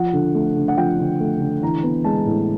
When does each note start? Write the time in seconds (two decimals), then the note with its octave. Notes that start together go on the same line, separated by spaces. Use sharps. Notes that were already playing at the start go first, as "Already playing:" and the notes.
Already playing: F3 F#5
0.13 D3
0.35 A3
0.56 D3
0.68 F#5
0.77 F3 G5
0.99 D3
1.20 A3
1.41 D3
1.62 E3 A#5
1.83 B3
2.04 G#3 A5
2.26 A2